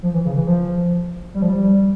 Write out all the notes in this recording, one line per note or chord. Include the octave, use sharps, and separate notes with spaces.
F3
E3
C#3
E3
F3
G3
F3
G3